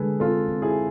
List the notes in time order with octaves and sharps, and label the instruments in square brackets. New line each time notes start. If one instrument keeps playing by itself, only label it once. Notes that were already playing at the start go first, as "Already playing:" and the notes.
Already playing: [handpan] D3 G#3 [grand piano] G#4 A4 B4
[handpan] C4 [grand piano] F4 A4
[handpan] C4
[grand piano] E4 G#4